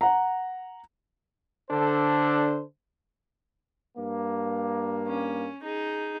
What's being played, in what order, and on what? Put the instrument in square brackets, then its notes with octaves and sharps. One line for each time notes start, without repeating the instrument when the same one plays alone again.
[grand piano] F#5 A#5
[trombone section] D3 D4 A4 C5
[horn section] G2 A#3
[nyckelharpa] C#4
D#4 G#4